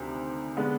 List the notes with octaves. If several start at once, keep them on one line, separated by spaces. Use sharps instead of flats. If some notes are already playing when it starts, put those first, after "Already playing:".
Already playing: D2 C3 D#3 C5
D3 G#3 B3